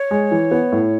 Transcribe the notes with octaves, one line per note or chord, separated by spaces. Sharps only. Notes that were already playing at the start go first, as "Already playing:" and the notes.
Already playing: C#5
G#3
E3
B3
A2